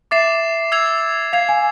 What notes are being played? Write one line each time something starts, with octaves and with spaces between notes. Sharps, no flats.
E5 D6 A6 C7 E7
E6 G#6 C7 F7
F5 G#6 C7 F7
G#5